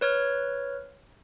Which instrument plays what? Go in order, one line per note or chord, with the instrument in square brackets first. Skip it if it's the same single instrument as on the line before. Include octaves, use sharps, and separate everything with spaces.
[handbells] B4 C#5 F6 G#6